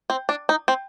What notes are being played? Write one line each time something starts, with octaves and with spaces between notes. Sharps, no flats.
C4
D4
D#4
C4